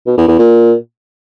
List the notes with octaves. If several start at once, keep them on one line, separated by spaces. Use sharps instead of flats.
B2
E2
E2
A#2